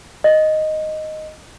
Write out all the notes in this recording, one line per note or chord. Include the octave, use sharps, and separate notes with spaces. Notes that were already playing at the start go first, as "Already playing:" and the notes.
D#5